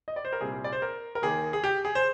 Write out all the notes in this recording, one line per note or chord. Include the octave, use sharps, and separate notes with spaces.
D#5
D5
C5
A#4
C2 A#2 G3 C4 G#4
D5
C5
A#4
A#4
D#2 D#3 A#3 G#4
G#4
G4
G#4
C5